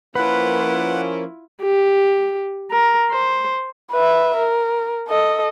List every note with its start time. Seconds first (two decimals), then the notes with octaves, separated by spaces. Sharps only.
0.15 F3 A#3 C#4 E4 F4 B4 F#5
1.63 G4
2.72 A#4
3.12 C5
3.92 B4 E5
4.36 A#4
5.08 A4 D#5